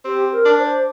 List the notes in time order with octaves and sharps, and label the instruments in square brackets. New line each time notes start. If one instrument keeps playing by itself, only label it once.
[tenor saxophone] C4 [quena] G4
[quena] A#4
[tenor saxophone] D4
[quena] C5